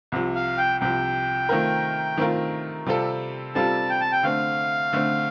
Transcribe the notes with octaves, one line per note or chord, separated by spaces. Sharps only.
C2 C3 F3
F5
G5
C2 C3 F3 G5
D#3 A3 C4 F4 A#4
D#3 A3 C4 F4 A#4
C3 G3 C4 F4 A4
C3 G3 C4 F4 A4 A5
G5
A5
G5
D3 A3 C4 F5
D3 A3 C4